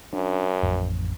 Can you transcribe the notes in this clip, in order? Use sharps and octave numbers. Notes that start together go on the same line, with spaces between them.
F#2 D4
A1 F2